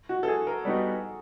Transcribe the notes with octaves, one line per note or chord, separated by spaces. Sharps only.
F#4
A4
G#4
A#4
G3 B3 D#4 F#4